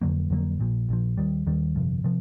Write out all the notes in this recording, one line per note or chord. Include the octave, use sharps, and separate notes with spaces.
F2 D3 F#3 A#3
F2 D3 F#3 A#3
A#1 A#2 F3
A#1 A#2 F3
D#2 D#3 G3
D#2 D#3 G3
G1 F2 C3 F3
C3 F3